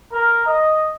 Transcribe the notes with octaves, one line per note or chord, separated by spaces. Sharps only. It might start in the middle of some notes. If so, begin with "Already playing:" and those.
A#4
D#5